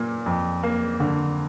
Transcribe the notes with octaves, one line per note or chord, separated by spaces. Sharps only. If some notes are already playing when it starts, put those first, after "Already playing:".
Already playing: A#2 A#3
F2
A#3
D3